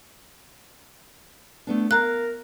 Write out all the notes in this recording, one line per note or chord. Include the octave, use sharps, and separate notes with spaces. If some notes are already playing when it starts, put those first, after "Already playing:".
A3 B3 D4
A#4 F5 A#5 F#6